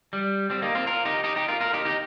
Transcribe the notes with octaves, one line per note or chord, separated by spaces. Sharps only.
G3
G3 C4
A#3 D#4
C4 F4
F4 A#4
D#4 G4
D#4 G4
D#4 G4
F4 A#4
F4 A#4
D#4 G4
D#4 G4